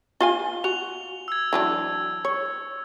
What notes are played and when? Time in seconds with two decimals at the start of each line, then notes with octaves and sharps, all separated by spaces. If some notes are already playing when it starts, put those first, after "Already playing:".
0.21 F4 F5 G#5 G7
0.64 F#4 F7
1.28 E6 G#6
1.53 E3 F#3 D4 G#6
2.25 C#5